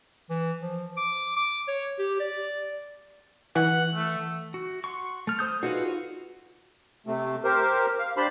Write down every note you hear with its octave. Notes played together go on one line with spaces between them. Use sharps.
E3
F3
D6
D6
C#5
G4
D5
E3 F#5
A3
F#4
F#5 C6 C#6
A3 F6
C5 D#6 G6
D#4 F4 F#4 G#4 A4 B4
C3 A3
G4 A#4 C5
F5
D4 G4 C5 A5 B5 C6